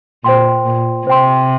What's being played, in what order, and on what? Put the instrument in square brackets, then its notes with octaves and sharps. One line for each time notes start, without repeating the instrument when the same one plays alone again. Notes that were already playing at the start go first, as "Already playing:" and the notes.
[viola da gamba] A#2 [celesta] C5 G5 C6
[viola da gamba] A#2
[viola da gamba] C3 [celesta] C5 G5 C6